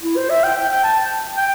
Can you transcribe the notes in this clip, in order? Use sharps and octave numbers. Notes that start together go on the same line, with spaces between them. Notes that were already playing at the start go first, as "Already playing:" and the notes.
E4
C5
E5
G5
G5
G5
A5
G5